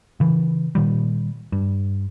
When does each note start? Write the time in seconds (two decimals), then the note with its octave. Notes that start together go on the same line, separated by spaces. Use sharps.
0.20 C#3 E3
0.75 A#2 D#3 G3
1.52 G2